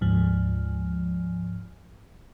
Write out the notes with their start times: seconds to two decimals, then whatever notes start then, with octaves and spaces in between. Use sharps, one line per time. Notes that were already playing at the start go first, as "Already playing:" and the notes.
0.01 D2 G#2 F3